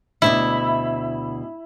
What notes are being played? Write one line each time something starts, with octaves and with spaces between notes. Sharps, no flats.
D2 B2 D4 E4